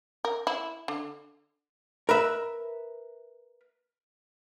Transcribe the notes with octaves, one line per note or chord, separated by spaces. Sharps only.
A#4
E4
D3
A#4 B4 E5